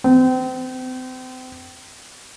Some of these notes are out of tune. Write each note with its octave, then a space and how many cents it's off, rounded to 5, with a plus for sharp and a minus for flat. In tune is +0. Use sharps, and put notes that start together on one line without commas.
C4 -35